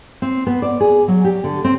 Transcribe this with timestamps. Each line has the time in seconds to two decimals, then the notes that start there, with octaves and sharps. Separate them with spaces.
0.22 C4
0.47 B3
0.62 D5
0.80 G#4
1.08 F#3
1.24 G4
1.44 D3
1.64 C4